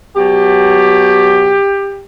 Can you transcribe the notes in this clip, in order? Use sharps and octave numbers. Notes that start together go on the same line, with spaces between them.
B2 F#3 G4